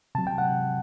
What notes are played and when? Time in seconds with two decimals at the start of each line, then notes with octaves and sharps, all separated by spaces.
0.15 C3 F#3 A5
0.27 G5
0.38 F#5